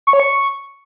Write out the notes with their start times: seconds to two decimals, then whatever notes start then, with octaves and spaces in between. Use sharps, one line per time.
0.07 C#6
0.13 C#5
0.20 C#6